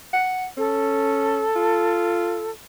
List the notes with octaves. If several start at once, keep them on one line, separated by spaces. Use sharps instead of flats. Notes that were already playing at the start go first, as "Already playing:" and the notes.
F#5
C#4 A4
F4